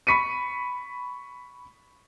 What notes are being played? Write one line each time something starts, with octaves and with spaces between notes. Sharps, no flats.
B5 C#6 B6 C#7 D#7